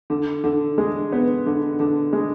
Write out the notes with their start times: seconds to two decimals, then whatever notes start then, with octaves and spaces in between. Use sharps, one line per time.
0.10 D3
0.44 D3
0.78 G#3
1.12 B3
1.46 D3
1.80 D3
2.13 G#3